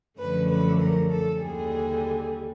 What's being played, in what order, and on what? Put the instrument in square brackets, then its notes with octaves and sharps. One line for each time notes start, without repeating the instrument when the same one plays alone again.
[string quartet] F#2 D3 F3 A3 C#4 B4
B4
A#4
A4
D#2 D3 G3 G#4